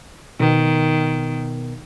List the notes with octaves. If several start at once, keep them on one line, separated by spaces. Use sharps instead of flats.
B2 D#3 B3 A#4